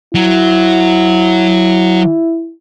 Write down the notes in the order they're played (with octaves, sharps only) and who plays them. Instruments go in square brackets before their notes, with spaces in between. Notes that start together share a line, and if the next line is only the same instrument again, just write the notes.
[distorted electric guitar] F#3 [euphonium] E4